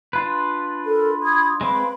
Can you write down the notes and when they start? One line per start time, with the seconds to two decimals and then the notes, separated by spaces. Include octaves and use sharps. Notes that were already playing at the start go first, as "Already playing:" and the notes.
0.13 D4 F4 B4
0.87 A4 A#4
1.23 B5 D#6 G#6
1.61 G#3 C4 B4 F5 B5 D6